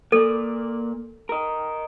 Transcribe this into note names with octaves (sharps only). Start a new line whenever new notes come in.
A#3 A4 D5
A#4 D#5